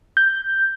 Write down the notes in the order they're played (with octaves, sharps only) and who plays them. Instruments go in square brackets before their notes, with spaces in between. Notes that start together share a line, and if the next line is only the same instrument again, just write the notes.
[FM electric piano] G6